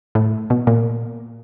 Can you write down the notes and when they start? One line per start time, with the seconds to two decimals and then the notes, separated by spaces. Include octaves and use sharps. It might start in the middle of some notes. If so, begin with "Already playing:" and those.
0.15 A2
0.50 B2
0.67 A#2